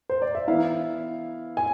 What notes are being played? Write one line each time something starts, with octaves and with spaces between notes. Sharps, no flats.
C5
D5
E5
E3 B3 E4 F5
G#5